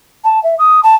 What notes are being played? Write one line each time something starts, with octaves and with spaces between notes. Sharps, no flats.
A5
E5
D#6
A5